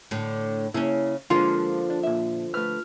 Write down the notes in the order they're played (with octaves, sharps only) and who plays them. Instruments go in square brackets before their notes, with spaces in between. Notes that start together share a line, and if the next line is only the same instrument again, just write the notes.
[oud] A2 D3
[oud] C#3 C#4 [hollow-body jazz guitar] A#3 E4
[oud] D3 F3 A#3 [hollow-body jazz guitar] G#3 D4 [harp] F4
[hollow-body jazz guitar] D4
A#2 E5
[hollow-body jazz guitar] A3 B4 [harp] F6